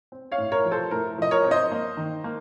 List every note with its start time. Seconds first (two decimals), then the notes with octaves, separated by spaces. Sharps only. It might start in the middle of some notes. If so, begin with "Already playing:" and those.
0.12 C4
0.32 C#5 F5
0.38 A2
0.52 A#4 C#5
0.65 F3
0.71 A4 C5
0.91 A2 A#4
1.18 F3 D#5
1.31 A#4 C#5
1.44 C4
1.51 C5 D#5
1.71 A#3
1.97 D#3
2.24 A#3